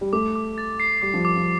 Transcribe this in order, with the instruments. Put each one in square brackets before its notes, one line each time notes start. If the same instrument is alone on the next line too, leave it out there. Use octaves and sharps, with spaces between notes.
[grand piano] G3
[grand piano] A3 [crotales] D6
[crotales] D6
A6
C7
[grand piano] G3 [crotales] D6
[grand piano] F3
[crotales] D6
[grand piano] F3